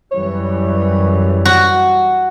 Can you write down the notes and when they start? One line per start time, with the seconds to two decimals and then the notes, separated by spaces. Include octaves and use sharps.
0.12 F#2 E3 G3 C#5
1.45 F#4